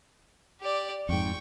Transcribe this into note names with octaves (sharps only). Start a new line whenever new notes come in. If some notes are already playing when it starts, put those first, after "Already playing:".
G4 D5
F2 G#2 G5 C#6